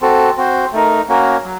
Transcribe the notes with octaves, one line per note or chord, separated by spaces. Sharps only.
C4 F#4 A4
C4 F#4 C5
A3 D#4 A#4
A#3 C#4 F#4 A#4
F#3